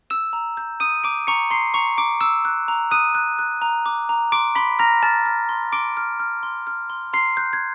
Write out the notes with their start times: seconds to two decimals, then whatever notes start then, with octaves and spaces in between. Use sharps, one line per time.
0.10 E6 E7
0.33 A#5
0.57 G6
0.80 D#6 G6 D#7
1.04 A#5 D6 D7
1.27 A#5 C#6 C#7
1.50 A#5 C6 C7
1.74 A#5 C#6 C#7
1.97 A#5 D6 D7
2.21 D6 E6 E7
2.45 F#6
2.68 A#5
2.91 D#6 F#6 D#7
3.15 F#6
3.39 F#6
3.62 A#5
3.86 D6
4.09 A#5
4.32 C6 D6 D7
4.55 B5 C6 B6
4.79 A#5 F6 A#6
5.03 A5 F6 A6
5.26 F6
5.49 C6
5.72 C6 D6 D7
5.97 F6
6.20 F6
6.43 C6
6.67 F6
6.90 C6
7.13 A#5 C6 C7
7.37 F#6 G6
7.53 G#6